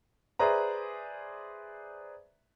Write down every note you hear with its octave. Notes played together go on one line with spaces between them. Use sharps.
G#4 B4 C5 D5 E5 A#5